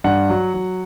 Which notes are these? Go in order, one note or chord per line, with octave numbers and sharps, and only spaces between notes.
G2 F#5
F#3
F#3